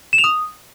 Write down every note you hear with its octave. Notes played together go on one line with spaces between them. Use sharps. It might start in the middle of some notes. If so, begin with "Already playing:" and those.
E7
F7
D#6